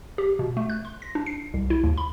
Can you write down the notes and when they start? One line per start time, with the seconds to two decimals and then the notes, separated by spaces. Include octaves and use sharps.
0.18 G4
0.39 B2
0.57 A3
0.70 F#6
0.85 C6
1.02 A#6
1.15 D4
1.26 C7
1.54 C2
1.70 E4
1.84 D#2
1.98 B5